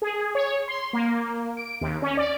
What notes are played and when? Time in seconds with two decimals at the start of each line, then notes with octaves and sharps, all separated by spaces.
0.02 G#4
0.35 C#5
0.68 C6
0.93 A#3
1.57 D7
1.81 D#2
2.02 C#4
2.17 D5